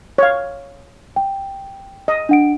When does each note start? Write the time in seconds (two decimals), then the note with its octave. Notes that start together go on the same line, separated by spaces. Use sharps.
0.18 C#5 F5
1.16 G5
2.08 D#5
2.29 D4 F#5 D7